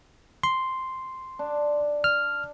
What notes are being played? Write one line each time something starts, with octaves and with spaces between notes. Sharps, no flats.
C6
D4
F6